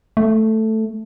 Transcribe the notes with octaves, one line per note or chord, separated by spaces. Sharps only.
A3